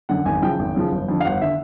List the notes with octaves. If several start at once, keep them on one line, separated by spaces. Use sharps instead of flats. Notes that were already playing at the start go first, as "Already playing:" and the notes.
F#2 D3 F#5
G#1 G#5
F#2 C#3 F3 G5
G#1
F#2 C#3 F3
G1
F2 D3
F5
G1 F#5
D3 E5